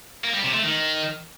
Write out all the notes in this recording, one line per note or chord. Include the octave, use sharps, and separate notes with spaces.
A#3
G3
C3
A3
D#3